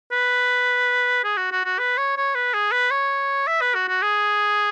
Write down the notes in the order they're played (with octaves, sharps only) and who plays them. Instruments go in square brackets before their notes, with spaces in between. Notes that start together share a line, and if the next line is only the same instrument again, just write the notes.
[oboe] B4
G#4
F#4
F#4
F#4
B4
C#5
C#5
B4
G#4
B4
C#5
E5
B4
F#4
F#4
G#4